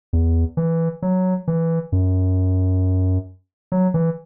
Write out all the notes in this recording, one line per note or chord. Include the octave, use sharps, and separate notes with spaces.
E2
E3
F#3
E3
F#2
F#3
E3